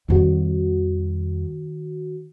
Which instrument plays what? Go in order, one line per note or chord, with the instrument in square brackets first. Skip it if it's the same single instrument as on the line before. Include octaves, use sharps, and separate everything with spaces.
[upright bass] F2 G3 [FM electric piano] D#3 F#4